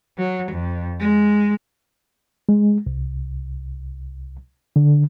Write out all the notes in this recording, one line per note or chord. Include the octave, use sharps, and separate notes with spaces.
F#3
F2
G#3
G#3
C2
D3